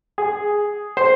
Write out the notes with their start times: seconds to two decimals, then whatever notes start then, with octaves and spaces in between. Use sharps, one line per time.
0.18 G#4
0.97 C5